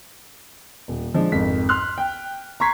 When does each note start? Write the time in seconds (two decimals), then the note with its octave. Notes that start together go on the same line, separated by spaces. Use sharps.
0.88 D#1
1.14 F3 G#3 D4
1.32 G#1 F2 B6
1.69 C6 F6 F#6
1.98 G5
2.60 A#5 C6 C#6 G#6 B6 C7